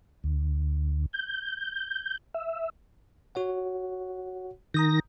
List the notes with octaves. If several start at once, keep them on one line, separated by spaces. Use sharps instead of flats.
D2
G6
E5
F#4 C#5 F#5
D#3 A#5 D#6 G6 A#6